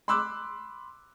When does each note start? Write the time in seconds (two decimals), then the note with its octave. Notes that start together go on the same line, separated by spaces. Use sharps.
0.08 B5 C6 D6 E6 F#6